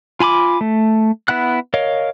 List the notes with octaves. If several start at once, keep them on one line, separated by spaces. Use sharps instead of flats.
F4 G#5 B5 D6
A3
B3 E4 F#5 F#6
A#4 C#5 D#5 F5